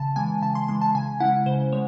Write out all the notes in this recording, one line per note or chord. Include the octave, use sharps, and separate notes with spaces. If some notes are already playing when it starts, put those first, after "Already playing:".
Already playing: C#3 A5
E3 G#3 G#5
C#3 A5
C6
E3 G#3 C6
A5
C#3 G#5
G#3 C#4 E4 F#5
C#3 C5
G#3 C#5